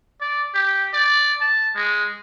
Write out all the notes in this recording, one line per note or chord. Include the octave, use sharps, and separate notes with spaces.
D5
G4
D5
A5
G#3